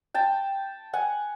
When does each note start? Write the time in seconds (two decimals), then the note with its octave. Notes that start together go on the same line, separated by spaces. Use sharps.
0.14 G5 A5
0.93 F#5 G#5